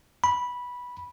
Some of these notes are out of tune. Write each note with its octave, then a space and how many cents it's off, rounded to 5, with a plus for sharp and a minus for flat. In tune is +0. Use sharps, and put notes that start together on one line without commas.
B5 -10